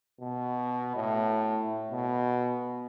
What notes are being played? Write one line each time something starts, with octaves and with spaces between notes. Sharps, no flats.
B2
A2
B2